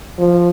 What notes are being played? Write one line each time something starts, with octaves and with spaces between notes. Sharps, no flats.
F3